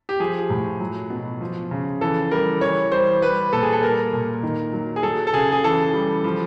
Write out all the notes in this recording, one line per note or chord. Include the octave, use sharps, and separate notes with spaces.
G4
F3 G#4
A2
F#3
B2
F3
C#3
E3 A4
G3 A#4
E3 C#5
G3 C5
G3 B4
A#2 A4
G#4
A4
G3 A#4
A#2
D#3
F#3
G#4
F#3 A4
A4
C#3 G#4
G#4
E3 A4
G3
F3